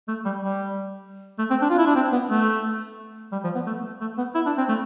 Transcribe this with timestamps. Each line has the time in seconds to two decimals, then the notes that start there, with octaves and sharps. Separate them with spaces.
0.08 A3
0.25 G3
0.42 G3
1.39 A3
1.50 C4
1.62 D4
1.70 F4
1.79 E4
1.87 D4
1.96 C4
2.13 B3
2.30 A3
3.32 G3
3.44 F3
3.55 B3
3.67 A3
4.01 A3
4.18 B3
4.35 E4
4.47 D4
4.58 C4
4.69 A3